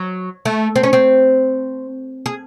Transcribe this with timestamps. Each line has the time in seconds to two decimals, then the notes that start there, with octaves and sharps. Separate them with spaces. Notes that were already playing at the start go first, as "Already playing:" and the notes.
Already playing: F#3
0.45 A3
0.76 C4
0.83 C#4
0.93 C4
2.26 G#4